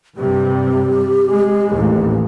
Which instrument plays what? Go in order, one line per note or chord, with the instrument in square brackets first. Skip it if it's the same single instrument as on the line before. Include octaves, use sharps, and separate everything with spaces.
[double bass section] G2 C3 G3 [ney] G4
[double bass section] G#3
A1 D#2